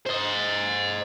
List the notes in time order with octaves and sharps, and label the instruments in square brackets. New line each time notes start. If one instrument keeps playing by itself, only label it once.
[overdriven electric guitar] C5 D#5